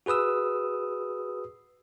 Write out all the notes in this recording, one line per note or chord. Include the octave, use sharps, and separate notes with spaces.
F#4 G#4 B4 D#6 E6